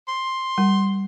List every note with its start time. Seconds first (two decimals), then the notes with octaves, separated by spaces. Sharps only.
0.08 C6
0.58 G3